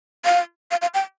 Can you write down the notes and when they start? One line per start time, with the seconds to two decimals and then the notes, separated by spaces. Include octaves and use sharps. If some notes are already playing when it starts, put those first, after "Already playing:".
0.25 F5
0.71 F5
0.82 F5
0.94 G5